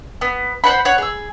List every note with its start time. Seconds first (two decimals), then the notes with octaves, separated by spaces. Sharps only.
0.21 B3
0.64 C5 D5 F#5 B5
0.85 C#5 F#5
0.98 G#4 E6